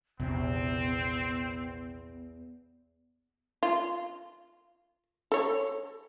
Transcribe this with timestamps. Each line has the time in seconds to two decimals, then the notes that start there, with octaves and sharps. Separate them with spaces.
0.20 A#1 E2 C3 B3 C4
3.63 F4
5.32 A4 C#5